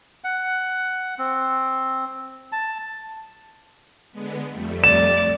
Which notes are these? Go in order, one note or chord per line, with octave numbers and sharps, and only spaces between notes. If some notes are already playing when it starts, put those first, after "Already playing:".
F#5
C4
A5
D3 G#3 B3
F2 G3 A3
D5 E7